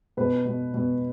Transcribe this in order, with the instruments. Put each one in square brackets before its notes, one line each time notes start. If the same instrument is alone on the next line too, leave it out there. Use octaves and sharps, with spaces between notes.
[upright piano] B2 B4
B2
B2